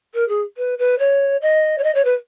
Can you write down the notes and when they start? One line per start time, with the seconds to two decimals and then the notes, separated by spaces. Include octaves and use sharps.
0.14 A#4
0.28 G#4
0.57 B4
0.78 B4
0.99 C#5
1.42 D#5
1.78 C#5
1.84 D#5
1.95 C#5
2.05 B4